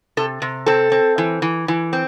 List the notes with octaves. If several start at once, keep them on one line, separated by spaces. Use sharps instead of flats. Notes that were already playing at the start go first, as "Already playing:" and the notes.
C3 A4
C3
C4 A4
C4
E3
E3
E3
C4